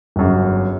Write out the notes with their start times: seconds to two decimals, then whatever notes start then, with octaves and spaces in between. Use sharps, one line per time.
0.16 G1 F#2 C#3